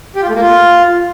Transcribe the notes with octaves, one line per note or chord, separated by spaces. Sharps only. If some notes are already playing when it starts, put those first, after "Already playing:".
G4
F4
A3
A#3
F4